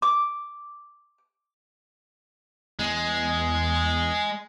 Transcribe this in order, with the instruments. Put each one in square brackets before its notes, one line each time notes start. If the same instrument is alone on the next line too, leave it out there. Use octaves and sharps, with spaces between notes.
[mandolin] D6
[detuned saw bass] E2 [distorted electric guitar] G#3